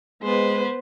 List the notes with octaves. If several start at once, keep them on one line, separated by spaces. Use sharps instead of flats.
G#3 B3 B4 C5